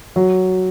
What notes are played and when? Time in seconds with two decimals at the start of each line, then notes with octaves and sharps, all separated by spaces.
0.16 F#3